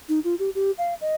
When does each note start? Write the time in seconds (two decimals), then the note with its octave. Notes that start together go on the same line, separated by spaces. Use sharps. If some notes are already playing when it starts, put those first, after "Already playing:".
0.09 D#4
0.24 F4
0.39 G4
0.55 G4
0.78 F5
1.01 D#5